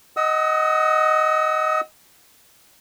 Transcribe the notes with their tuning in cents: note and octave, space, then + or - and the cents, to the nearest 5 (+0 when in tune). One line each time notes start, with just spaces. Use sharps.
D#5 +0 F#5 +15 E6 -45